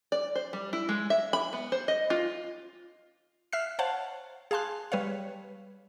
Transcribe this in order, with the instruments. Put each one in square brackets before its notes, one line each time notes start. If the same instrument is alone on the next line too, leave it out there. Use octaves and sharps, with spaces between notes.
[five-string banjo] D5
C5
G3
E4
G#3
E5
B5
B3
C5
D#5
F4
[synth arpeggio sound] E5 F6 F#6 C7
C5 C#5 F5 F#5 A5
G#4 F5 A5 C6 F#6
G3 B4 C#5 F5